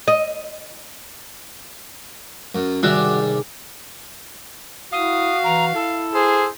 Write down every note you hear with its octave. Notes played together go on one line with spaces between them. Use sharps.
D#5
F#2
G#1 C3 D#3 G3 D4 F#4 E5
E4 F#4 F5 D#6
E3 A#5
E4 A4
G#4 C5